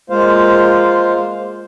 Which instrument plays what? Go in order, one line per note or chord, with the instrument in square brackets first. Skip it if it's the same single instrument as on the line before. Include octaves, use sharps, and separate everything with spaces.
[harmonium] G#3 A#3 F4 C5 F5